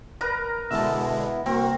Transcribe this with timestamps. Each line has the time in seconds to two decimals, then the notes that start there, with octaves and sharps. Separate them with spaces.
0.21 A#4 B4 A#5
0.71 B2 D3 G#3 B3 E4 E5 A5
1.46 C2 A#3 C4 F#4 A#4